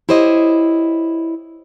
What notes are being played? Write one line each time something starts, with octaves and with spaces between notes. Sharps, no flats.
E4 G4 C5 C#5 D#5